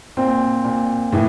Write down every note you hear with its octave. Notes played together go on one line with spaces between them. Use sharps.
A#2 C4
A#2
A2 E3